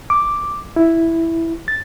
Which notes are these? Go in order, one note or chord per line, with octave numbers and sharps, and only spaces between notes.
D6
E4
A6